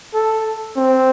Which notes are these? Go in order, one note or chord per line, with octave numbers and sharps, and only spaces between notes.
A4
C4